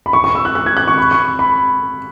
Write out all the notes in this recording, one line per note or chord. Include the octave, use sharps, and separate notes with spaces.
B5
C#6
C#6
E6
F#6
F#6
G#6
F#6
C#6
B5
C#6
B5